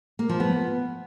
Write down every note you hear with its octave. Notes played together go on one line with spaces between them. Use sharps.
A#3
F3
B3